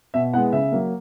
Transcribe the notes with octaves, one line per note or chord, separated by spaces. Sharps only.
B2 E5
G#3 B3 E4 F#5
C#3 E5
F#3 A#3